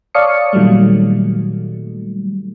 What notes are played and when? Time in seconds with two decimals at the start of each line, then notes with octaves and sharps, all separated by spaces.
0.14 C#5 D5 F5 A5 D#6 C#7
0.53 A#2 D#3 F#3 G3 A3